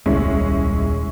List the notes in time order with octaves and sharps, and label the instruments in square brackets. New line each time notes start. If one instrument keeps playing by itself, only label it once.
[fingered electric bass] D#1 C2 [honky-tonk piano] G#3 C#4 E4